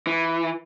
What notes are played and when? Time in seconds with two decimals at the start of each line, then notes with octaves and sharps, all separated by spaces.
0.07 E3